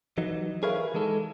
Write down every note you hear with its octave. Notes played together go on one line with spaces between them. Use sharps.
E3 F#3 D#4
G#4 A#4 B4 C#5 E5 F5
E3 G#3 D#4 A4